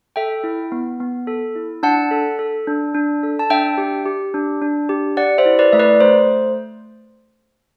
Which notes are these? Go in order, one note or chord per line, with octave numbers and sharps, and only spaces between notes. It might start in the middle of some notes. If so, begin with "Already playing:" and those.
A4 E5 G5
E4
B3
B3
A4
E4
D4 F#5 A5
A4
A4
D4
D4
A4
A5
D4 E5 G5
G4
G4
D4
D4
G4
G4 D5 F#5
C5 E5
E4
B4 D5
A3 E5
B4 D5
A3 C5